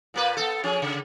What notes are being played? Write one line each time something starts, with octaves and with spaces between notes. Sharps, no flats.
A#2 A#3 B4
B3 A4
F3 C#4 G#4
C#3